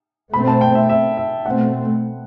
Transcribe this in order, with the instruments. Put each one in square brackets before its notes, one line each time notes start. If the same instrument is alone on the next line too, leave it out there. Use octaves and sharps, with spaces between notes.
[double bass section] B2 A3 C4 [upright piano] B5
[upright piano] A5
G5
E5
E5
E5
[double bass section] B2 A3 C4 [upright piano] F#5